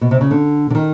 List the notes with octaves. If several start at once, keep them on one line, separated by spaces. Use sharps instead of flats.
B2
C3
C#3
D3
D3
D#3